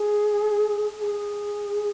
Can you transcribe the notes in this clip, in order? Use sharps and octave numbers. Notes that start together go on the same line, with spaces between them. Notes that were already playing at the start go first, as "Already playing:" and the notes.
Already playing: G#4
G#4